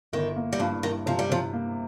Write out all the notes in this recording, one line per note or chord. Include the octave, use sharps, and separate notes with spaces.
G1 D#3
A#3
G3
G2 F3
G2 D#3
C3 F3
G3
C3 F3
A#3